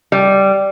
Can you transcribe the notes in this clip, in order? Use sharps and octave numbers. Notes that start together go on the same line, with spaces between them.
G3